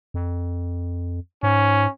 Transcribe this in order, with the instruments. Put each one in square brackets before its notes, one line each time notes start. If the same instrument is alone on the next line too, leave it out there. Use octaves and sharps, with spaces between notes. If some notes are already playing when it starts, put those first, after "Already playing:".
[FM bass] F2
[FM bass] G#2 [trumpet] C#4